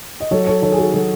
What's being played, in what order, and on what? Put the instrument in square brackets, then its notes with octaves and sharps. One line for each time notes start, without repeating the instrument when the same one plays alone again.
[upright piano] D#5
F#3 A4 C#5
A4 C#5
D#3 A4 C#5
G#4
F#4 A4
F#3 F#4 A4